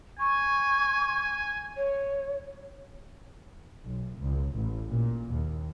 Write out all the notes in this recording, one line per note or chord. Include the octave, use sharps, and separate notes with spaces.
G#5 C#6
C#5
B1
C#2
A1
A#2
D#2